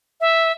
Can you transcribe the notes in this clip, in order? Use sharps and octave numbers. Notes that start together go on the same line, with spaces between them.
E5